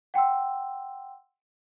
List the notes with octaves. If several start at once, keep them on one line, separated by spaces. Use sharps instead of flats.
F#5 G5 C6 E6